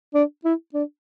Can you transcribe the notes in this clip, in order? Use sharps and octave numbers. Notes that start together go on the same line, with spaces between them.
D4
E4
D4